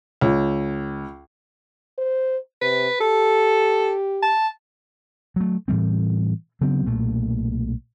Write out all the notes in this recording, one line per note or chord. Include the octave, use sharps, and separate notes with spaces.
C#2
C5
C3 B4
G4 A4
A5
F#3 A3
A2 E3 G3 C4
C#3 F#3 B3 C4
B1 A#2 A3